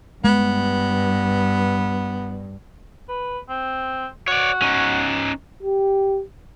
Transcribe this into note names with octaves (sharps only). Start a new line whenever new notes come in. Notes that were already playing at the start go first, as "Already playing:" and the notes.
G2 G#3 B3
B4
C4
F#4 C#5 D5
C#4 D#4
G4